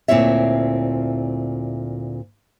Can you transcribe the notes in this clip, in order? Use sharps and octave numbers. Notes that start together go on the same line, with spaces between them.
D2 A#2 C4 E4 C#5 E5